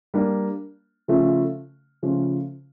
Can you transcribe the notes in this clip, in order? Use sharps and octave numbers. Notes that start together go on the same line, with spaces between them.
G3 A#3 D4
C#3 F3 A3 C#4 F4
C#3 F3 A3 C#4 F4